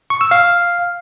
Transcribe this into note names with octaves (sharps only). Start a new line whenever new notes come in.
C#6
E6
F5